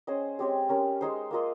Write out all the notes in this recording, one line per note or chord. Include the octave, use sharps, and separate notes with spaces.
C#4 G#4 C5 D#5
G#3 C4 G4 C#5
C#4 G4 A#4
G#3 D#4 G#4 C5
A#3 F4 A#4 D#5